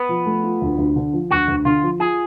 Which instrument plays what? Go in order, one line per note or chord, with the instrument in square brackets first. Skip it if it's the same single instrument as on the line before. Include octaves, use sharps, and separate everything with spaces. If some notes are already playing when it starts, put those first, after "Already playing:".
Already playing: [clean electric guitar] B3 [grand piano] B4
[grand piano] F3
A3
F4
D2
D2
D3
F3
[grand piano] D2 [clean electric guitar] F#4
[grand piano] D2
[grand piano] D3 [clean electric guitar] F4
[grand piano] F3
[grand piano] F4 [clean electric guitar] G#4